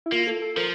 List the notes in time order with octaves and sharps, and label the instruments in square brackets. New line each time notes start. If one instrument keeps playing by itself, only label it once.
[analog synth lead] E4
[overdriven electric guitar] A#3 [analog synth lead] F4
[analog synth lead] A4
A4
[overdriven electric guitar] F3 [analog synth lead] A#4